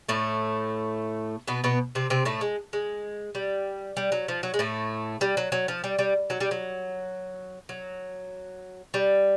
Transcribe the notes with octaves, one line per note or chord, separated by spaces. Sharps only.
A2 A3
B2 B3
B2 B3
C3 C4
C3 C4
A2 A3
G#3
G#3
G3
G3
F#3
F3
F#3
G#3
A2 A3
G3
F#3
F#3
F3
G3
G3
F#3
G3
F#3
F#3
G3